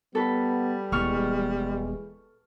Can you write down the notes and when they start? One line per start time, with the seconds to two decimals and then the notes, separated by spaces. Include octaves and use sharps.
0.15 G3 B3 A4 B4 B5
0.92 D#1 E3 G#3 B3 C#6 F6